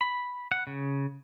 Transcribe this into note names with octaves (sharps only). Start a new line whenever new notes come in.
B5
F#5
C#3